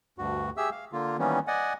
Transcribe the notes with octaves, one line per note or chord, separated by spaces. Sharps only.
D2 G2 F#4
G4 G#4 E5 E6
F5
D3 A#3 F4
D#3 E3 G3 A#3 B3 C#4
D5 D#5 F#5 G#5